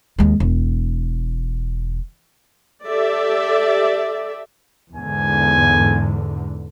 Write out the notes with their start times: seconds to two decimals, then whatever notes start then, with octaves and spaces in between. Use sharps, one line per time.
0.18 D#2 G#3
0.40 E1
2.86 G4 A4 D5 E5
4.96 E2 G#2 D3 G#5